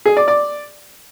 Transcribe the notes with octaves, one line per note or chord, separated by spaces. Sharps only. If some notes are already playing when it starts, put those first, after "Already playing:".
G#4
D5
D5